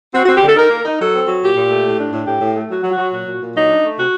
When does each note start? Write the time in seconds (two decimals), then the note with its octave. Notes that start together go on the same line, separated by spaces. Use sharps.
0.13 C4 F#4
0.23 F#4
0.27 C4
0.34 G4
0.41 D3 A4
0.56 D#4 A#4
0.70 A#3
0.84 D#4
0.98 F#3 A4
1.13 C4
1.27 F#3
1.41 A#2 G4
1.55 A#2
1.69 A3
1.83 A2
1.98 D4
2.12 A2
2.26 A2 G4
2.40 A2
2.54 A3
2.69 F#3 F#4
2.83 F#3
2.90 F#4
2.98 F#3
3.11 A#2 F#4
3.25 A#2
3.40 A#2
3.54 F#3 D#4
3.68 D4
3.83 A3
3.96 C3 F#4